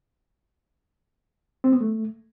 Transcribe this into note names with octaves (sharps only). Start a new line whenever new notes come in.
C4
B3
A3